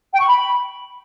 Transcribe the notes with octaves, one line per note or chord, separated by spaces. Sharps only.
G5
C#6
B5